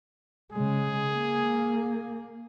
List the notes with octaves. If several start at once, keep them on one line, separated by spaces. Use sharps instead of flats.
C#3 G#3 G#4
A#3